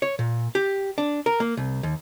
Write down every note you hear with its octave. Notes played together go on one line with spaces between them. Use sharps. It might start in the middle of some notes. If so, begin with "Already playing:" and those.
C#5
A#2
G4
D4
A#4
A#3
C2
D#2